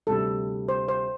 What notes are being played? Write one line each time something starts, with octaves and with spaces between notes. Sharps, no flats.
D2 C3 G3 A4
C5
C5